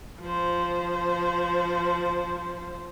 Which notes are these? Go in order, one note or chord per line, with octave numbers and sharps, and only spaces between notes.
F3 C5